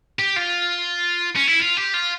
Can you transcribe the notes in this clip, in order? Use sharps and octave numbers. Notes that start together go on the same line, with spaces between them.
G4
F4
C#4
E4
F4
G4
F4